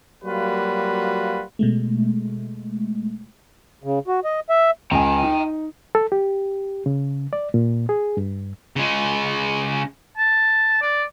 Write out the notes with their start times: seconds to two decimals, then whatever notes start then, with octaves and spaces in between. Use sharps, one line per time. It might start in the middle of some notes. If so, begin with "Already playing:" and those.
0.24 F#3 G3 A#3 F4 F#4 B4
1.59 B2 G#3 A3
3.84 C#3
4.07 F#4
4.24 D#5
4.49 E5
4.91 C#2 G5 G#5 A#5
5.23 D#4
5.95 A4
6.12 G4
6.86 C#3
7.33 D5
7.54 A#2
7.89 G#4
8.17 G2
8.76 C#3 G#3
10.18 A5
10.82 D5